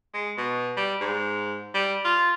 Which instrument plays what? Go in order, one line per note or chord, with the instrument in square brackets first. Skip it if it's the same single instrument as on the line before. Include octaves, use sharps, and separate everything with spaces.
[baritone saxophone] G#3
B2
G3
G#2
G3
F4